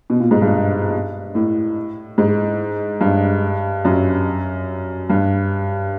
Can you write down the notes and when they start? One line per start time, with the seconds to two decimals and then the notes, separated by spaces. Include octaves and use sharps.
0.10 B2
0.20 A#2
0.31 G#2
0.41 G2
1.35 A2
2.18 G#2
3.01 G2
3.85 F#2
5.10 G2